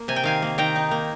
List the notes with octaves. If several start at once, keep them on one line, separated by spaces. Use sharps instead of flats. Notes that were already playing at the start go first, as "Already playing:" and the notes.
Already playing: A#3
C3 G#5
G5
D#3 F5 G#5
A#3
D#3 G5 A#5
D#4
A#3